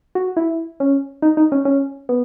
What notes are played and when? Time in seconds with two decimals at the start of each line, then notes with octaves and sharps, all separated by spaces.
0.15 F#4
0.37 E4
0.80 C#4
1.22 D#4
1.37 D#4
1.52 C#4
1.65 C#4
2.09 B3